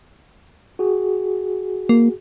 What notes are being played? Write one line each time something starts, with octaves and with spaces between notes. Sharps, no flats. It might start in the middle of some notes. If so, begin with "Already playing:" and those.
F#4 G#4
A#3